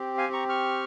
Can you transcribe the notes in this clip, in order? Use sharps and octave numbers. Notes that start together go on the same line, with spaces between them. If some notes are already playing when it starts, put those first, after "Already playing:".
Already playing: C4 G4
F5 G#5
A#5 C#6
C#6 F6